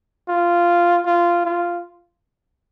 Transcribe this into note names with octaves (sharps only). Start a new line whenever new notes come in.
F4
F4
F4